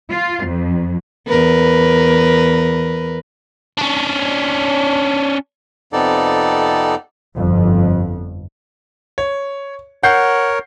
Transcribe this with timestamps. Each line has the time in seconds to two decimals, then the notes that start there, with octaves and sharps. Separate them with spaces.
0.11 F4
0.46 F2
1.27 E2 A#4 B4
3.78 C#4 D4
5.93 F2 C3 B3 D#4 A4 D5
7.36 G1 F2
9.18 C#5
10.03 A#4 C#5 F#5 G6 C7